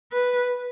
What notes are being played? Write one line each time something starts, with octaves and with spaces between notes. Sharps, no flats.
B4